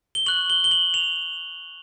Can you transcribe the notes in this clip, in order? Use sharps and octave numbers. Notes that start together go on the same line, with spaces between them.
G7
C#6 F#6 F#7
G7
G7
F#7
F7